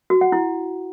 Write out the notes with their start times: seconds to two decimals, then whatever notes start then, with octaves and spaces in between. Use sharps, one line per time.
0.10 F#4
0.21 F#5
0.32 E4